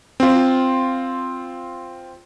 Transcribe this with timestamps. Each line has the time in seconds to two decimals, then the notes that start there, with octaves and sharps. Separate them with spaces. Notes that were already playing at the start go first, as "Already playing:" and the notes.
0.20 C4 F4